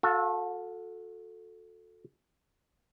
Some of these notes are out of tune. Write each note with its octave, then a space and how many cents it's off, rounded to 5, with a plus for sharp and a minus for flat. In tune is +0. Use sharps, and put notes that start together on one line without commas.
F#4 -40 A4 +0 F5 +0